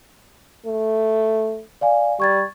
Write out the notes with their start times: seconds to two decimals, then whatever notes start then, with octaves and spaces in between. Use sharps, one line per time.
0.66 A3
1.81 D5 F5 G#5
2.20 G3 C#6 G#6 A6